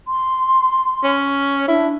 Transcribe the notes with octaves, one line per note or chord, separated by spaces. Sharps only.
C6
C#4
D4 E4